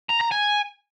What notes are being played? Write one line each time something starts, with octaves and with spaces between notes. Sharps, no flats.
A#5
A#5
G#5